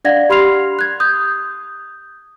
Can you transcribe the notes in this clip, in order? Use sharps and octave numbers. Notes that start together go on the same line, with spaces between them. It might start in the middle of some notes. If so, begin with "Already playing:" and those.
D4 D5 F5 F#5 G#6 A#6
G4 B5 C6 F6 C7 F7
F#6 G#6
D#6 G6